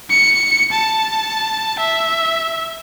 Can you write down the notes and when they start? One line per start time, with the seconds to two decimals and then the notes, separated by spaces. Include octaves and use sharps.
0.10 C#7
0.72 A5
1.79 E5